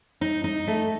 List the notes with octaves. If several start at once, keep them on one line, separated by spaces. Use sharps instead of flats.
D#4
D#4
A3